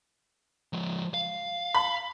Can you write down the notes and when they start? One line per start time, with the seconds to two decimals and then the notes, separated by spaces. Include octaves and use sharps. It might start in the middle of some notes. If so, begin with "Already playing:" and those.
0.73 F3 G#3
1.14 F5
1.75 B5